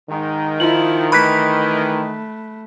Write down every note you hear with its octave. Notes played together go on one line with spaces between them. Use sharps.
G#2 D#3
F3 E4 F4 F#7
E3 A3 B5 F#6 B6